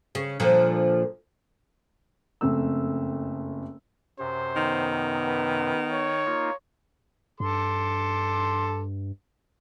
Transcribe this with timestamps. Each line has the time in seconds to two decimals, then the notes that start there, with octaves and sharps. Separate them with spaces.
0.15 C#3
0.40 A#2 D3 F3
2.41 F#1 F2 A3 E6
4.19 F#2 C3 C5
4.56 D#3 B3
5.27 B4
5.91 C#5
6.26 A#3 D#4 F4
7.40 G2 A4 C6 D6